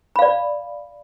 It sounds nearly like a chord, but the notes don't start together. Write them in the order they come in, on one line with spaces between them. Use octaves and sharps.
B5 F5 D5